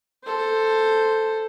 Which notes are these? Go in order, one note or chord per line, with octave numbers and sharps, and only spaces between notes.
A4 C5